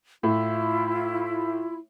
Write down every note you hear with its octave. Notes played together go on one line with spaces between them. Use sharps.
A2 E4 F4